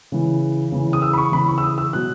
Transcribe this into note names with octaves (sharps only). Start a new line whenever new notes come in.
C#3 E3
C#3 E3
D#6
E6
B5
C#6
C#3 E3 B5
C#6
E6
D#6
E6
B2 F#3 F#6